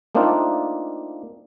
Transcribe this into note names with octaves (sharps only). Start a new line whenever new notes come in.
A3 A#3 C4 D4 D#4 F4